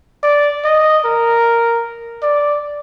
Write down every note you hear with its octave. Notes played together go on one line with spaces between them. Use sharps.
D5
D#5
A#4
D5